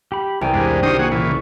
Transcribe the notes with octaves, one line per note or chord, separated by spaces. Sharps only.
G4 B5
C2 A#4 D5 G5 G#5
E2 G2 G#3
D#3 D4 F#4 G4 C5 D#6
A#3 F#4 G#4 F#5 G#5
A#2 C#3 E3 C#6